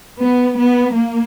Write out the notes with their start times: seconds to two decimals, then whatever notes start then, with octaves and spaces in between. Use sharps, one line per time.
0.21 B3
0.59 B3
0.96 A#3